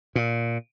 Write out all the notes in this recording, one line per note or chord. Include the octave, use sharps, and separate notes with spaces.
A#2